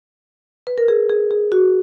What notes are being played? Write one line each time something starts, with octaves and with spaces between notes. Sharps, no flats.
B4
A#4
G#4
G#4
G#4
F#4